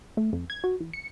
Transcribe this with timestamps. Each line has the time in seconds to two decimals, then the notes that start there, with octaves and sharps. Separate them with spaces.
0.17 A3
0.33 F2
0.50 G#6
0.64 F#4
0.80 E3
0.94 C#7